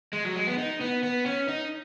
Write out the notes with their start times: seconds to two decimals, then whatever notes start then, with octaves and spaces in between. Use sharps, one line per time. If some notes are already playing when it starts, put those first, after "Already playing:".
0.13 G#3
0.25 F#3
0.36 G#3
0.47 B3
0.58 D#4
0.81 B3
1.03 B3
1.26 C#4
1.48 D#4